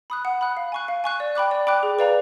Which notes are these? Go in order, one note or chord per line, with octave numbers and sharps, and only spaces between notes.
B5 D#6 F#6
F#5
B5 D#6 F#6
F5
G#5 C#6 F#6
F5
G#5 C#6 F#6
D5
G5 B5 D6 F#6
D5
G5 B5 D6 F#6
G#4
B4 D5 F5 A#5